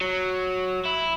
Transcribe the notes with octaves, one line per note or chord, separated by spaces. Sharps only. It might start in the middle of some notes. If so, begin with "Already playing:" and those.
F#3
E4